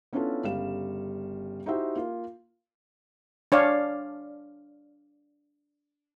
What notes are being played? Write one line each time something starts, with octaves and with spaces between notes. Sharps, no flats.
B3 C#4 D4 E4 F4 A4
G1 C#3 G3 F5 E7
D#4 E4 F#4 G4 C5 E5
A#3 F4
D4 C#5 D5 F5